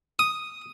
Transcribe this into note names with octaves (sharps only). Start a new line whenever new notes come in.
D#6